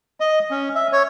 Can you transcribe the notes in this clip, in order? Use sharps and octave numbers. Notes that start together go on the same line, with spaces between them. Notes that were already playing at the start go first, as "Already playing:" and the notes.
D#5
C#4
E5
C#5